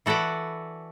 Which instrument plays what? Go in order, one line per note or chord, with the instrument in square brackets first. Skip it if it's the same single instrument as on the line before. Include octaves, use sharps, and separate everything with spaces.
[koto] E3 F#4 A4 B4 D5